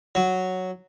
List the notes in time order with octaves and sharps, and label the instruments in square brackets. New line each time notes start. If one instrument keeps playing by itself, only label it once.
[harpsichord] F#3